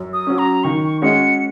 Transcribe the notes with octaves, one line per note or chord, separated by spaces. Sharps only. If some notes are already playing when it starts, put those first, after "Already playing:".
Already playing: F#2
D#6
F#3 C#4
A#5
D#3 C#6
G#3 C#4 F#4 D#5 C#7